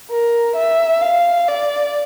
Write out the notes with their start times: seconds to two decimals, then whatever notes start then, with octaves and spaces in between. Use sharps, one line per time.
0.10 A#4
0.56 E5
1.02 F5
1.48 D5